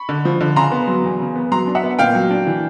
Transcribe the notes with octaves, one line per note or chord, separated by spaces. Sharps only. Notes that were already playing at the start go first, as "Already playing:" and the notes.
Already playing: B5 C#6
D3
F3
D3
C#3 A#5 C6
B3
F#3
E2
C#3
B3
F#3 A#5 C6
D4
E5 F#5
B3
A#2 F5 G5
F#3
D4
E3